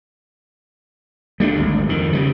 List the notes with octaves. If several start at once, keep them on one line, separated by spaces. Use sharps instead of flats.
G3 A3 C4 D4
G#1 D2
F2 D#3
C#3 G3